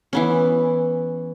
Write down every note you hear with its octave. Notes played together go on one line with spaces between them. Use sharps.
E3 B3 C#4